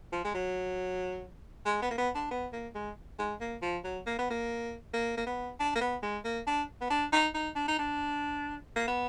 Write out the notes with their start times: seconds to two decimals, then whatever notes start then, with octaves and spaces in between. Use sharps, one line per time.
0.12 F3
0.24 G#3
0.34 F#3
1.66 G#3
1.82 B3
1.90 A#3
1.98 B3
2.15 D4
2.31 B3
2.53 A#3
2.75 G#3
3.19 G#3
3.40 A#3
3.62 F3
3.84 F#3
4.06 A#3
4.18 B3
4.30 A#3
4.93 A#3
5.17 A#3
5.26 B3
5.59 D4
5.75 A#3
5.81 B3
6.02 G#3
6.24 A#3
6.47 D4
6.81 B3
6.90 D4
7.12 D#4
7.34 D#4
7.55 D4
7.68 D#4
7.79 D4
8.76 A#3
8.87 B3